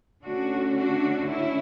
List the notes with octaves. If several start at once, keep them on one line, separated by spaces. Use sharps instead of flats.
D3 A3 C#4 D4 F#4
D4 F#4
C#4 E4